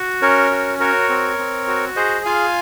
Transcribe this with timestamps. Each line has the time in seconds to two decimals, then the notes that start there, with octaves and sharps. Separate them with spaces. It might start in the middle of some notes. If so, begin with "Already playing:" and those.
Already playing: F#4
0.22 C#4 A#4 C#5
0.51 F#4
0.80 F#4 A#4 C#5
1.09 C4
1.38 C4
1.67 F#4
1.96 G#4 C5 D#5
2.25 F4 F5 G#5